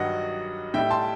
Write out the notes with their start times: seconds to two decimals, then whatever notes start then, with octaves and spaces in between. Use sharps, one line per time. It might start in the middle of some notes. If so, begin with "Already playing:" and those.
Already playing: G2 D#3 F#3 D#5 F#5
0.74 A2 G3 E5 G5
0.91 A5 C6